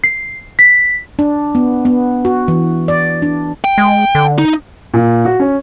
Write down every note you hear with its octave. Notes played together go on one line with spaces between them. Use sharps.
C7
B6
D4
B3
B3
F#4
E3
D5
D4
G5
G#3
D3
D#4
A#2
F#4
C#4